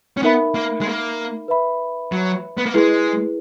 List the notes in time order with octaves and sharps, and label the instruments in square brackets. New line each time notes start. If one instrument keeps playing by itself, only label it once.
[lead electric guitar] C#4
[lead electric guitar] B3 [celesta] D#4 A#4 E5 B5
[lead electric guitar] A#3
G#3
A#3
[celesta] B4 E5 B5
[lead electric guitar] F#3
B3
A#3
[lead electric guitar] G#3 [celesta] E4 G#4 B4